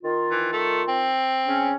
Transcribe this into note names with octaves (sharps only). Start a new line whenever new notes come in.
D#3 F4
E3
A3
C4
C#3 C#4